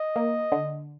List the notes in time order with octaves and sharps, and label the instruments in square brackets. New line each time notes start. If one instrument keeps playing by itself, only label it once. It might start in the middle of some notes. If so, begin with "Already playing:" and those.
Already playing: [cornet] D#5
[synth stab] A#3
D3